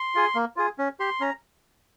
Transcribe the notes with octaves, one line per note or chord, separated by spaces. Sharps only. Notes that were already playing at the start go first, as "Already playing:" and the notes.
Already playing: C6
F4 G#4
A#3
F4 G#4
C#4
G4 C6
C#4 A#5